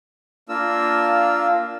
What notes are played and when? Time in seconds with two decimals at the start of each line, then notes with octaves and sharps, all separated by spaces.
0.49 A#3 D4 F4 A#4 E6